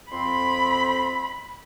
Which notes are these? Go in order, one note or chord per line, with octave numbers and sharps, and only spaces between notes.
F2 C4 B5 C6